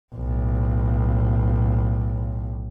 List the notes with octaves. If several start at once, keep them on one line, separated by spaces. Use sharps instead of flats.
B1 A2